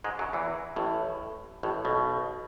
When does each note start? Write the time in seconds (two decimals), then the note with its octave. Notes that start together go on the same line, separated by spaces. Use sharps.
0.04 G#2 G#3
0.19 F#2 F#3
0.33 E2 E3
0.76 A1 A2
1.63 A1 A2
1.85 B1 B2